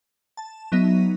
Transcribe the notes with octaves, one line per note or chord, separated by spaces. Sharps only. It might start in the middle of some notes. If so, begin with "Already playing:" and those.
A5
F#3 B3 D#4 E5